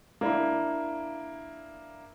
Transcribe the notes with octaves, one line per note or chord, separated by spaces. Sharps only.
A#3 D4 E4